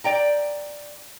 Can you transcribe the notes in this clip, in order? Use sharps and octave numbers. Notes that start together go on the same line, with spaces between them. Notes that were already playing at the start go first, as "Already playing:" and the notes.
D5 G5 A#5